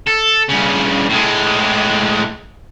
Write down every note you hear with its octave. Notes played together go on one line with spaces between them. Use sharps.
A4
G2 C#3
A2 G#3